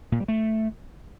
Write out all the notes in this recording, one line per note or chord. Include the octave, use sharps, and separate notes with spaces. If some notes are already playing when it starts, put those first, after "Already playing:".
A#2
G3
A3